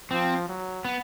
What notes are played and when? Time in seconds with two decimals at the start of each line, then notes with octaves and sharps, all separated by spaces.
0.11 F3 C4
0.48 F#3
0.85 B3